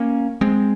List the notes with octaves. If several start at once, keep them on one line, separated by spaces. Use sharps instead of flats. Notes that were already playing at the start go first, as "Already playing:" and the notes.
Already playing: A#3 C#4
G#3 C4